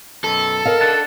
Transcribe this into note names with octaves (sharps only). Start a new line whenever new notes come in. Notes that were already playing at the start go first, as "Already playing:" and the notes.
F#2 B2 A4
A#4 D#5 F5
D4 F#5 A5